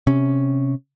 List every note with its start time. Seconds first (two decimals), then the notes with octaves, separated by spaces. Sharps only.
0.07 C3 C#4